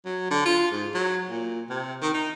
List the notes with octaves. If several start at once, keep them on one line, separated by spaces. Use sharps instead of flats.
F#3
D3
F4
G#2
F#3
A#2
C3
D#3
D#4